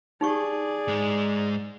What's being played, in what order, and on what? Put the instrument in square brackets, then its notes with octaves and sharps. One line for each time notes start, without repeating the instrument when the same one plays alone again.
[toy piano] D#4 G4 C#6 [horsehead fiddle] G#4 D5
[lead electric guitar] G#2 G#3